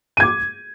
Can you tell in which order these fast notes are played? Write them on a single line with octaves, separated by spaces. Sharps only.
D#7 G#6 D6